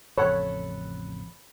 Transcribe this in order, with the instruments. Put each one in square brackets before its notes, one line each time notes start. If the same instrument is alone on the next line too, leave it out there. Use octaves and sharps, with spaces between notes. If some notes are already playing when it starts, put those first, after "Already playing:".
[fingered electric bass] A1 F2 C#3 [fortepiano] A4 F#5 [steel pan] C#5 [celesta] B5